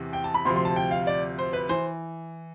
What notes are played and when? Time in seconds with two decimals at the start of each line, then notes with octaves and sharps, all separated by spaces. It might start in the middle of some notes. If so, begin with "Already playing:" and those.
Already playing: E2 C3 E3
0.13 G5
0.24 A5
0.34 B5
0.45 D2 C3 F3 C6
0.56 C6
0.65 A5
0.76 G5
0.91 F5
1.07 D5
1.38 C5
1.53 B4
1.69 E3 C5